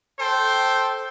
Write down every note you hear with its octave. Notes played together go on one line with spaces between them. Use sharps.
A4 C5 G5